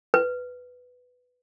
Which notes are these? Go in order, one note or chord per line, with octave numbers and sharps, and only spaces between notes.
B4